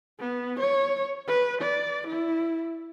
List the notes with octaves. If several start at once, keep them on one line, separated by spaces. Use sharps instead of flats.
B3
C#5
B4
D5
E4